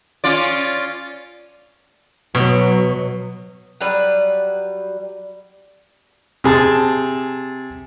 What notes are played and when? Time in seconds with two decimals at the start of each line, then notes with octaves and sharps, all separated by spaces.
0.24 C#4 F4 D5
2.35 B2 F#3
3.81 F#3 G3 B4
6.44 C3 G#4 A5